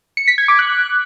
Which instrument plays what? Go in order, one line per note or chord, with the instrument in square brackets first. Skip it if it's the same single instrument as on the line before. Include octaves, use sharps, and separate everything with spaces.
[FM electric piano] C#7
B6
G#6
D6
F#6